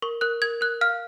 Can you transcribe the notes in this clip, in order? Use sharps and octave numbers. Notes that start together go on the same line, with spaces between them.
A#4 C#6
A#4 F#6
A#4 G#6
A#4 F#6
F5 F6